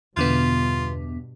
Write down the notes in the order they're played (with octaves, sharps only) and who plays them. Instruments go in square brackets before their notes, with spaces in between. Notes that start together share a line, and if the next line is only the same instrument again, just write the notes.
[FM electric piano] E2 D3 B3 [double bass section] G2 B2 [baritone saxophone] F4